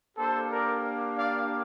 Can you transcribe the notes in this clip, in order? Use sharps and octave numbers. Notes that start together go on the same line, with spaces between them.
A#3 D4 G4 A4 C5
A#4 D5
D5 F5